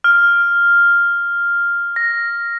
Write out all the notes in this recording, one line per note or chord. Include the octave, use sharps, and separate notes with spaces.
F6
A#6